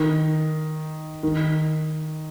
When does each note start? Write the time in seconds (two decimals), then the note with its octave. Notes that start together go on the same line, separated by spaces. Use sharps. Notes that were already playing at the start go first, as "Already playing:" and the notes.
Already playing: D#3
1.23 D#3